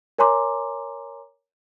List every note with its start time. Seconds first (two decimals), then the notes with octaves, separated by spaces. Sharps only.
0.19 A#4 C#5 G#5 A#5 C6 D6